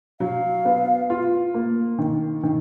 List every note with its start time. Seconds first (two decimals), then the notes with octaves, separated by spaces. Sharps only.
0.20 F#3 F5
0.65 B3
1.10 F4
1.54 A#3
1.99 D#3
2.43 D#3